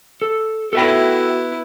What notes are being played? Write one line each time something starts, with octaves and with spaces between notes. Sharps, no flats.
A4
B3 E4 F#4 A4 E5 G5